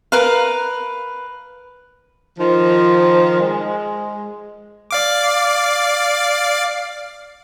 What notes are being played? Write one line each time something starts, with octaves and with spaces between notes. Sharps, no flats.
A#4 B4 F5
D#3 F3
G#3
D5 F5 D6